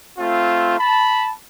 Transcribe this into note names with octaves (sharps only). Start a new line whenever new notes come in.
A3 C4 F4
A5 B5